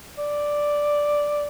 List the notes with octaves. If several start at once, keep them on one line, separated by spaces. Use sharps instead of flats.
D5